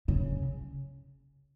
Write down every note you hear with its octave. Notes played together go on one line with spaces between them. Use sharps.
C#3